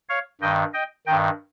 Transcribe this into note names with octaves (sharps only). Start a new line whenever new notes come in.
C#5 F5
G2 D#3 D#5 G5
D#5 G5
G2 D#3 D#5 G5